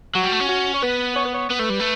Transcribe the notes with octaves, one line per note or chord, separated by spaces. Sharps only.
F#3 F#4
G3
A3
C#4
F#4
C#5
B3 B4
C#5
B4
C#5
B3 B4
A3
G3
A3